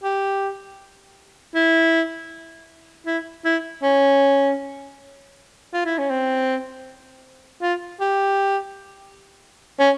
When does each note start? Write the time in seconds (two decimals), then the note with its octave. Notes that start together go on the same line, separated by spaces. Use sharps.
0.03 G4
1.55 E4
3.07 E4
3.45 E4
3.83 C#4
5.74 F4
5.86 E4
5.98 C#4
6.10 C4
7.62 F4
8.01 G4
9.80 C#4